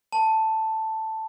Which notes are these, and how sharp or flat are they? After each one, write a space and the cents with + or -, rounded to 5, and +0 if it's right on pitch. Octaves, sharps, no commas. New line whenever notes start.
A5 +5